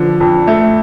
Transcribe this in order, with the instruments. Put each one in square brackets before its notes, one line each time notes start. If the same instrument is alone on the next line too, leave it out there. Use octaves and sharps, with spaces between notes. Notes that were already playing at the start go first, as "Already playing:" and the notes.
Already playing: [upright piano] D3 F3
F2
A3